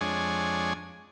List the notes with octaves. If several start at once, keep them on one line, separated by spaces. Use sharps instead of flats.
F2 G#3 D4 C#5 G#5